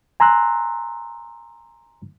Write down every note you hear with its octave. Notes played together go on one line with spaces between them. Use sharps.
G#5 A#5 C6 E6 F#6